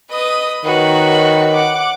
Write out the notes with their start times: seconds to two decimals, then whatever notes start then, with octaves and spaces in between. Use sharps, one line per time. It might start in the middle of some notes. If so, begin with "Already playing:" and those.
0.11 B4 D#5 D#6
0.65 D#3 F#4 B4 C#5
1.52 F#5 D6